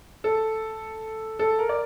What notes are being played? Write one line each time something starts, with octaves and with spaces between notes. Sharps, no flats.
A4
A4
A#4
D5